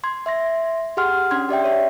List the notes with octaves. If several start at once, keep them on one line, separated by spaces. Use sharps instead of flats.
C6 G#6
E5 C6 A#6
G4 G#4 F#5 C6 F6
C#4 D4 C6 G#6
G4 D5 E5 G5
C#5 E5